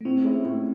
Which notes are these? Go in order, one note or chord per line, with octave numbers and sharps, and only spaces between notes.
A3
A2 C4
G#3 C#4 E4
A2